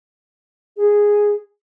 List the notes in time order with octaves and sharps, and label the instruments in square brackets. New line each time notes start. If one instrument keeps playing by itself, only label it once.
[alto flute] G#4